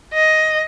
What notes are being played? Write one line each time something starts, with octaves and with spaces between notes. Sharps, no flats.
D#5